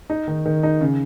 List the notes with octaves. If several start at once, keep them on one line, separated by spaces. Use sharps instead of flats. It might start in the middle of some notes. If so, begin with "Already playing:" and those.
D#4
D#3
D#3
D#4
C#3